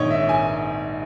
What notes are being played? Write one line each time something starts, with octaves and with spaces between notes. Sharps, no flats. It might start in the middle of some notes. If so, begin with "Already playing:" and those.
Already playing: A#1 G#2 D#3 C#5 D#5
E5
G#5